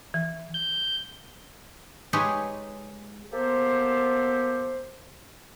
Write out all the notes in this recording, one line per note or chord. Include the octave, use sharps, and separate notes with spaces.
E3
G6
G#3 D#4 G4 G#4 B4 C#5
A#3 B3 G4 A4 C5